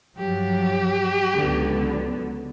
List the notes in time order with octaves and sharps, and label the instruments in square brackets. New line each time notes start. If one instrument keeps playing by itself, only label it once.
[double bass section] G2 F#3 [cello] F3 [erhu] G4
[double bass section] C#2 F#3 B3 [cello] D3